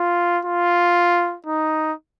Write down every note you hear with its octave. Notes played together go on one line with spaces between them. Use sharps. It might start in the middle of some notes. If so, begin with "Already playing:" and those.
Already playing: F4
F4
D#4